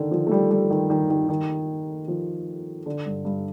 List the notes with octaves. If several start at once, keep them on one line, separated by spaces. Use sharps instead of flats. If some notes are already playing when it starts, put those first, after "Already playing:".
Already playing: D3 D#3
F3
A3
G3
G3
D#3
D#3
D#3
D#3
F3
D3
G2
G2